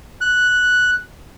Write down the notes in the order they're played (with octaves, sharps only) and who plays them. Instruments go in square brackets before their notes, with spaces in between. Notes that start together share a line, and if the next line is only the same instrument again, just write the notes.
[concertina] F#6